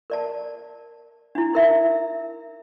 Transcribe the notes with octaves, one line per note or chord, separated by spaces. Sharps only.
A#4 D5 A5
D4 E4
D#4 A#4 E5